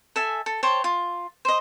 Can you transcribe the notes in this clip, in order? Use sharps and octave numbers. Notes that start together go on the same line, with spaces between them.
A4 E5 G#5
A4
C5 C#5 G5 A5
F4
C5 D#5